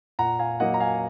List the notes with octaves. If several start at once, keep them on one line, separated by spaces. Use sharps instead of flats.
A#2 F#5 A#5
F5 G#5
F#3 A#3 D#5 F#5
A#5
F5 G#5